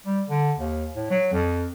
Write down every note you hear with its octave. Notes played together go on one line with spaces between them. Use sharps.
G3
D3
D#2
A2
F#3
F2